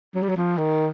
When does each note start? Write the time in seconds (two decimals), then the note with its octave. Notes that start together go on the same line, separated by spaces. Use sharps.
0.15 F#3
0.22 G3
0.29 F#3
0.37 F3
0.58 D#3